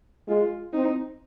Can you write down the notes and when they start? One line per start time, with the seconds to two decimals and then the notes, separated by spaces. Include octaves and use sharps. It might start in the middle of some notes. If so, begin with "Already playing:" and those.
0.28 G#3 F4
0.73 C4 D#4